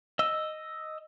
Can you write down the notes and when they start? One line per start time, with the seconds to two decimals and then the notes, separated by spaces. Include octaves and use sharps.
0.19 D#5 E6